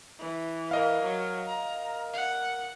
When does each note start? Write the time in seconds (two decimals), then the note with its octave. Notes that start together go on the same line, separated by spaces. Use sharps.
0.20 E3
0.71 A#4 D#5 F5
1.03 F#3
1.47 A#5
2.14 F#5